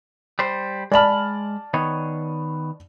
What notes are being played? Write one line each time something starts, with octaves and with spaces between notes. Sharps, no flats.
G3 C5
G#3 D5 A5 B5 F6
D#3 B3 C#5